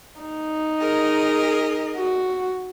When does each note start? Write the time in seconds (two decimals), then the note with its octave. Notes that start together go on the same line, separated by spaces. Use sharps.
0.21 D#4
0.79 G#4 A#4 D#5
1.97 F#4